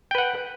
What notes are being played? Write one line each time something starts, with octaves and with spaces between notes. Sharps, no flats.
B4 F#5 G5